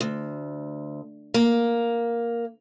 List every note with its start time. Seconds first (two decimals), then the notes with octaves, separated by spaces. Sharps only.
0.01 D2
1.34 A#3